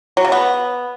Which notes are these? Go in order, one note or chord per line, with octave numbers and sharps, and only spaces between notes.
F#3
C#3
B3